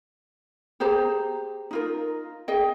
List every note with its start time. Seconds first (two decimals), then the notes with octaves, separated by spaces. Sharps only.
0.80 G4 G#4 C5 A#5
1.71 D#4 F4 A#4
2.48 G#4 D#5 G5